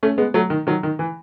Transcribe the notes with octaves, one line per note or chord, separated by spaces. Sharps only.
A3 C#4
G#3 B3
F#3 A3
D#3
D#3 F#3
D#3
E3